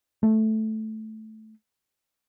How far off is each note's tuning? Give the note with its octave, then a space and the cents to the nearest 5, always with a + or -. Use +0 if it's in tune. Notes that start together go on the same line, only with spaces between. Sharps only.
A3 -5